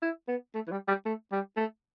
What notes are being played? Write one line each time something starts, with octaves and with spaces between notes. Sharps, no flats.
E4
B3
A3
E3
G3
G3
A3
G3
A3